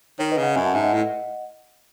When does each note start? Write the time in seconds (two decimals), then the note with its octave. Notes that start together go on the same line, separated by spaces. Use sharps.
0.19 D#3 C#5
0.31 B4 D#5
0.37 C#3
0.43 D#5 F#5
0.55 F#2 E5 G#5
0.65 F#5 A5
0.74 G#2 E5 G#5
0.83 D#5 F#5
0.93 A2